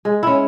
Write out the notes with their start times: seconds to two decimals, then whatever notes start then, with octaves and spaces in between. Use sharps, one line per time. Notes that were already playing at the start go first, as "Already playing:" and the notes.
0.05 G#3
0.23 C#4 E4